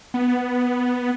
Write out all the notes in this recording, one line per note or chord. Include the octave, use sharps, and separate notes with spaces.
B3